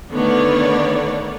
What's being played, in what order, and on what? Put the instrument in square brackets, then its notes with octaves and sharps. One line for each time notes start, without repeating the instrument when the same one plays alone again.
[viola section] D3 D#3 A3 B3 C#5 D5